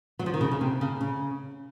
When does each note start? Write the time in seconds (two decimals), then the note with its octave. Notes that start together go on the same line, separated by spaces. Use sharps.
0.19 F#3
0.26 F3
0.34 D#3
0.41 C#3
0.51 C#3
0.61 C3
0.81 C#3
1.01 C#3